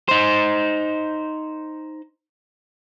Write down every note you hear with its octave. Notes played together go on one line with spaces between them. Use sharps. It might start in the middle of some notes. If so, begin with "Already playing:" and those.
D#4 C5